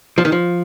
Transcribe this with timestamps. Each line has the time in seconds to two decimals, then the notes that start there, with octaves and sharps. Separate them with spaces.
0.18 F3
0.25 D#3
0.32 F3